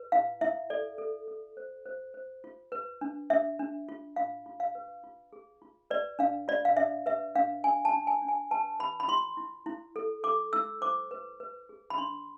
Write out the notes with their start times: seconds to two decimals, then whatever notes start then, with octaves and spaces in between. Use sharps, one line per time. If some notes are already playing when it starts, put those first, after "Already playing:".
Already playing: B4
0.12 E4 F5
0.41 E4 E5
0.70 A4 D5
0.98 A4
1.28 A4
1.57 C5
1.86 C5
2.14 C5
2.44 F4
2.72 B4
3.01 D4
3.30 D4 E5
3.59 D4
3.89 F4
4.16 F4 F5
4.46 F4
4.60 F5
4.75 B4
5.04 F4
5.33 G#4
5.62 F4
5.90 B4 D5
6.19 D4 F5
6.48 F4 D5
6.65 F5
6.77 D4 E5
7.06 B4 E5
7.36 D4 F5
7.64 D4 G#5
7.85 A5
7.93 D4
8.07 G#5
8.22 D4
8.28 G#5
8.51 B4 A5
8.79 B4 B5
9.00 B5
9.08 F4 C6
9.37 E4
9.66 E4
9.96 A4
10.24 A4 D6
10.53 E4 E6
10.81 C5 D6
11.11 B4
11.40 B4
11.69 G#4
11.90 B5
11.98 D4 C6